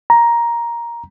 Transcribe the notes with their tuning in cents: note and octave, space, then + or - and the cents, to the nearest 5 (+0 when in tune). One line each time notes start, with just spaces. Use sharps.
A#5 +10